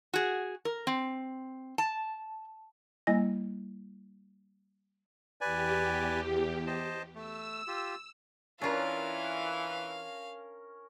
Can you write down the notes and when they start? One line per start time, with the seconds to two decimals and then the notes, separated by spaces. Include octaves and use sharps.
0.14 F#4 G#4
0.65 A#4
0.87 C4
1.78 A5
3.07 G3 A#3 E4 D#5 G#5 A#6
5.41 E2 G4 B4 D5 G#5
6.67 C5 D#5 A5
7.15 A3 E6
7.67 F4 G4
8.62 E3 C#4 D4 F4 A#4 F5